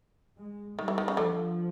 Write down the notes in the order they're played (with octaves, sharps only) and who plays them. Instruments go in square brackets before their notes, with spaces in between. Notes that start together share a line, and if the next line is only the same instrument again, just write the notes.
[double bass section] G#3
[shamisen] D#3 [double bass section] G3
[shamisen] E3
D#3
C#3
[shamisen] D3 [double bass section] F3